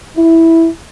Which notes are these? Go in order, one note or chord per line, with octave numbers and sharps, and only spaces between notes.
E4